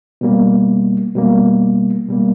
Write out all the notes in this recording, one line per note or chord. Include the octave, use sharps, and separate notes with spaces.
B2 G3 A#3
B2 G3 A#3
B2 G3 A#3